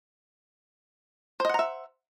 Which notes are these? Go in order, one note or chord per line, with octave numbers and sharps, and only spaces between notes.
C5 D#5 E5 F#5 A#5